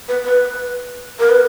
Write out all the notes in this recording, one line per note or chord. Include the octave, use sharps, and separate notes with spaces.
B4
B4
A#4
B4